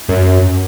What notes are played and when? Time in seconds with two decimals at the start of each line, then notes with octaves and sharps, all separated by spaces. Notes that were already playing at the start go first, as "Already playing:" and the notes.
0.09 F#2